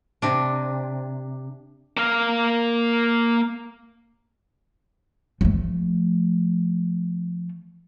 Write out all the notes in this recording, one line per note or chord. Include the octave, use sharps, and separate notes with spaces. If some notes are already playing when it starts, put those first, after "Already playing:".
C3 D4
A#3 F5
F3 A3